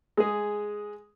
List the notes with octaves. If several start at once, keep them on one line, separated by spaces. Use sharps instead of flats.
G#3 G#4